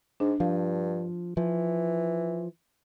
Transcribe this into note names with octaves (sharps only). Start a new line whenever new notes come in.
G#2 D4
G2 F3 F5
E3 F3